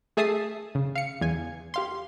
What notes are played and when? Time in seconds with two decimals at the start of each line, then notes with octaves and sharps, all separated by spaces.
0.17 A3 G#4 E5 A5 D#6 C7
0.75 C#3
0.95 F5 C#7
1.21 E2 G#5
1.74 G4 F5 C6